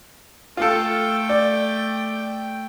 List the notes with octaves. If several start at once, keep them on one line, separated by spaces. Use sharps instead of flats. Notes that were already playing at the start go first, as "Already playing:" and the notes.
A3 F4 A4 G5
D5